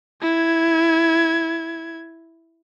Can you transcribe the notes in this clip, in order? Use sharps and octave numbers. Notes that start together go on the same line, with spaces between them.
E4 G#6